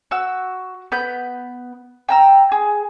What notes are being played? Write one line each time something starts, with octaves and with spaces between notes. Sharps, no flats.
F#4 E6
B3 B5 G6
G5 A#5 E6
G#4